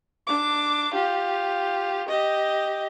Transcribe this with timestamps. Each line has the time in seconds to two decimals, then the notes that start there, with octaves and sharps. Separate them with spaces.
0.27 D4 D6
0.94 F4 G4
2.08 G4 D#5